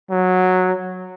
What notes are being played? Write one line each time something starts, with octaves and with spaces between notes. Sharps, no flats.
F#3